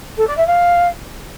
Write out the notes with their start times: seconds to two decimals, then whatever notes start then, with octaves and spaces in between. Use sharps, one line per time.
0.17 A4
0.27 D5
0.36 E5
0.46 F5